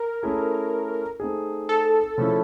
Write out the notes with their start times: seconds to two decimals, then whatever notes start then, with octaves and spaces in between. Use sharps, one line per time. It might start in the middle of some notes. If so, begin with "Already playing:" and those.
Already playing: A#4
0.23 A3 C#4 E4 G#4
1.20 A3 C4 D#4 G#4
1.69 A4
2.18 C#3 F3 A3 C#4 E4